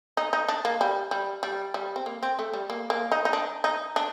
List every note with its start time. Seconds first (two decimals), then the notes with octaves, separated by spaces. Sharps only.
0.17 D#4
0.33 D#4
0.48 D4
0.65 A#3
0.81 G3
1.11 G3
1.43 G3
1.74 G3
1.96 C4
2.06 A#3
2.23 C4
2.39 A3
2.54 G3
2.70 A#3
2.90 A#3
3.12 D#4
3.25 D#4
3.33 D4
3.64 D#4
3.96 D4